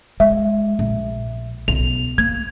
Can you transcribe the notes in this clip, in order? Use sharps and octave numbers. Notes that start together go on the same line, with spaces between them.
G#3 E5
A#1
B1 F7
A#3 G#6